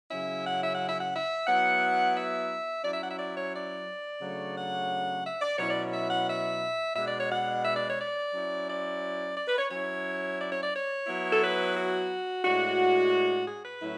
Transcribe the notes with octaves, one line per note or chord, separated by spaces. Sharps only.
C#3 F#3 C#4 E4 E5
F#5
E5
F#5
E5
F#5
E5
F#3 B3 E4 F#5
E5
F#3 C#4 E4 D5
E5
F#5
E5
D5
C#5
D5
C#3 F#3 A3 D4
F#5
E5
D5
B2 F#3 C#4 E4 C#5
D5
E5
F#5
E5
B2 G#3 D4 E5
D5
C#5
F#5
E5
D5
C#5
D5
F#3 C#4 E4
D5
D5
B4
C#5
F#3 C#4 E4 C#5
D5
C#5
D5
C#5
F#3 B3 E4
A4
B4
F#4
A2 G#3 D4 F#4
G#4
B4
A2 F#3 C#4 E4